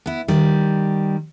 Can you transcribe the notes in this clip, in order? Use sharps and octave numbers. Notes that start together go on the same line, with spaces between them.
B3 E4
D#3 G3